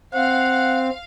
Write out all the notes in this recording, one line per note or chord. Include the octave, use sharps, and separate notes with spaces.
C4 F5 F#5